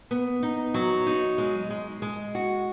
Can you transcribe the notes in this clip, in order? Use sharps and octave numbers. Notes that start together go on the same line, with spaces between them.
B3
D#4
F#3
D#4
G#3
G#3
G#3
F#4